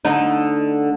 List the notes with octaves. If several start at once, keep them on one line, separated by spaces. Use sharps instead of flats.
D2 D3 D#4